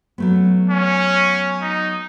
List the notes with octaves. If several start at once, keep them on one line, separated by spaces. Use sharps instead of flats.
F#3 A3 B3
C#4
D#4